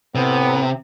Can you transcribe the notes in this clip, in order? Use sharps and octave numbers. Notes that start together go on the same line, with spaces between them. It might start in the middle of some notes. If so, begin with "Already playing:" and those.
A2 C3 B3